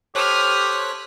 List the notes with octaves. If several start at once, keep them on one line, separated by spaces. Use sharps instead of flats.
G4 A4 C5 C#5 D#6 F6 F#6 B6